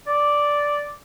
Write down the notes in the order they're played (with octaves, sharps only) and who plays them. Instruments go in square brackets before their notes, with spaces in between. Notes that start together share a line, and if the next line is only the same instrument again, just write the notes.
[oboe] D5